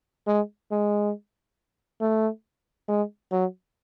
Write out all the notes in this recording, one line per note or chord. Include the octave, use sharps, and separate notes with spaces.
G#3
G#3
A3
G#3
F#3